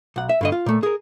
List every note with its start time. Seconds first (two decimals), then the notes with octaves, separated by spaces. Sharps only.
0.16 B1 F#5
0.29 E5
0.41 G2 D3 D#5
0.52 F4
0.66 A#2 A3
0.83 G#4 A#4